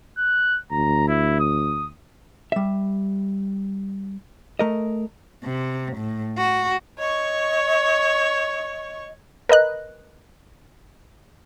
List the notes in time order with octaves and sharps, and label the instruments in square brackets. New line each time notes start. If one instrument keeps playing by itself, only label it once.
[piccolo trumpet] F#6
[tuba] D2 [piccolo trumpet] A#5
[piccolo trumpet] E4
D#6
[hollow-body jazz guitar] G3 E5
A3 A#4 D#5
[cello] C3
A2
F#4
[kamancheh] C#5 C#6 [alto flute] D#5
[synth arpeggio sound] A#4 B4 D#5 F#6